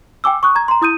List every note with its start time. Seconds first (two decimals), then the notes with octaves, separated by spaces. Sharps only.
0.24 G5 G#5 D6 E6
0.43 C#6 D#6 F#6
0.55 A#5 G#6
0.68 A#5 C6
0.82 E4 D#6 G6 D#7